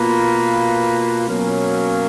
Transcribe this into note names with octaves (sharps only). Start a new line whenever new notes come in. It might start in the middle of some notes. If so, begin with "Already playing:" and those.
Already playing: B2 A#3 F4 B4
B2 F#3 A#3 C#4